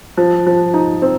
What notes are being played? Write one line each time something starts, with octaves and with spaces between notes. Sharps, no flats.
F3
F3
D#4
C4